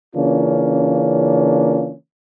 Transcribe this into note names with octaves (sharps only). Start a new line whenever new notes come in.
C#3 E3 A#3 C#4 D4 F4